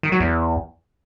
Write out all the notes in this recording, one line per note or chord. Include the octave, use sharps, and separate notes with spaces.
D#3
F#3
E2